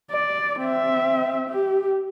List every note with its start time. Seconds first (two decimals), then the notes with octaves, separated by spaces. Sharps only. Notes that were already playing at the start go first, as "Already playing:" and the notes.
0.11 D5
0.60 C4 E5
1.50 G4